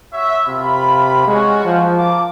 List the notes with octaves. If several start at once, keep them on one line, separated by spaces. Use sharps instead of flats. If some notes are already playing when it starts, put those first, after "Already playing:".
F#4 C#5 E5
C3 A#3 F4 B5
G#3 C#4 F4 F#4
F3
A#3 A5 D6